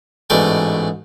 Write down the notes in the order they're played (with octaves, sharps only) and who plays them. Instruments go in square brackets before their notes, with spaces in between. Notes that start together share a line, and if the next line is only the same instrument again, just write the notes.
[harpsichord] A1 G#2 B2 A3 D5 G5